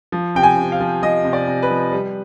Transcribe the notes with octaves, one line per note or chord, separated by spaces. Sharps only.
F3
C3 G5
G#5
C3
F5
F3
F3 D#5
C3
D5
C3
B4
F3
G3